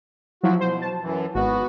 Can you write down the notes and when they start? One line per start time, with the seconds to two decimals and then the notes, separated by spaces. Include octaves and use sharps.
0.43 F3 F#3 E4 F#4
0.61 B2 C5
0.82 A5
1.02 F#2 E3
1.35 G#1 B3 F#4